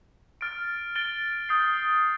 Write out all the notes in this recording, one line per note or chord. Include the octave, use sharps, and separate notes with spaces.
F6 A6 D7
A6 D7 G7
D#6 G6 C7